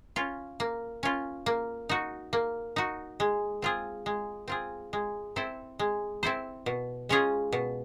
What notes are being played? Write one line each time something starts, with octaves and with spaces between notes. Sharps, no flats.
C#4 F4
A#3
C#4 F4
A#3
D#4 F#4
A#3
D#4 F#4
G#3
C4 F4 G#4
G#3
C4 F4 G#4
G#3
C4 E4 A4 C5
G#3
C4 E4 A4 C5
B2
G#3 C#4 F4 G#4
B2